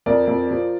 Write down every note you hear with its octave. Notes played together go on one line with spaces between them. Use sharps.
F2 A#4 D5
F2
F3